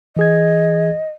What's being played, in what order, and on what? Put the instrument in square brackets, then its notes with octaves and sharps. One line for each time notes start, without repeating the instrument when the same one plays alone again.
[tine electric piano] E3 G#4 G#6 [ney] D#5